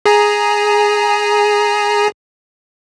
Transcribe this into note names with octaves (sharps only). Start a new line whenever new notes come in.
G#4 G#5 A#5